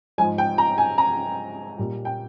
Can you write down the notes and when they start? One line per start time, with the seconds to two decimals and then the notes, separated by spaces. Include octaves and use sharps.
0.18 G#2 F3 G#3 G#5
0.38 G5
0.58 A#5
0.78 G#5
0.98 A#5
1.78 A#2 G3
2.05 G5